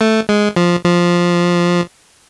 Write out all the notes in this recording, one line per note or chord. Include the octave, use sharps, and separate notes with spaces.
A3
G#3
F3
F3